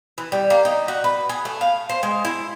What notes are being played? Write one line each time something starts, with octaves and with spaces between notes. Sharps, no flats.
E3
G3
A#3
D#4
F#4
B4
G#4
A3
F5
C5
G#3
E4